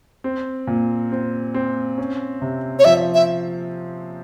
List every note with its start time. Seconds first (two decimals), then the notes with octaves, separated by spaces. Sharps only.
0.24 C4
0.67 A#2
1.12 C4
1.54 C4
1.98 C#4
2.42 C3
2.79 C#5
2.85 F3 E5
3.14 E5